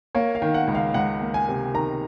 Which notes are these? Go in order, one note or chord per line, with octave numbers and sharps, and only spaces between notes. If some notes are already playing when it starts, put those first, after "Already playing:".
A#3 C#5
F5
D#3
F#5
C#2
F5
C#2 F#5
A#3
G#5
C3
D#3 A#5